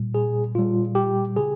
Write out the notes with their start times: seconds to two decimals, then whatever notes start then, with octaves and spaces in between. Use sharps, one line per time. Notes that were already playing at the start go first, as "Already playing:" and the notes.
Already playing: A#2 G3
0.15 G#4
0.55 A#2 G3 F4
0.95 G4
1.36 C#3 G#4